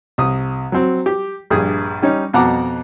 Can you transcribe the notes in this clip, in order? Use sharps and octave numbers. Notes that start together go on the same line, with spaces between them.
C2 D#6
F#3 C4
G4
A#1 G2 G#4 D#6
G3 C#4 D#4
F2 B2 F#5 A5 A#5 D6